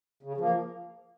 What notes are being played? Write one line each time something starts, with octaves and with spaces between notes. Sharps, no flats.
C#3
F3 A#3